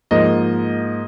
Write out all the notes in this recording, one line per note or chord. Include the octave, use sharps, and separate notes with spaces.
G#2 F3 A#3 D#4 D#5